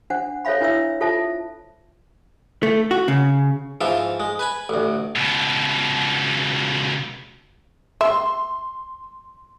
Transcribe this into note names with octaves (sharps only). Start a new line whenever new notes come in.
D4 C5 F#5
A4 C5 C#5 E5 F5 B5
D4 E4 B4 C#5 E5 E6
F4 A4 C5 E5 A5
A3
F#4
C#3
G#2 E3 F3 F4 E5
G#3
B4 G#5 B5
A1 D2
C#2 B2
E5 C6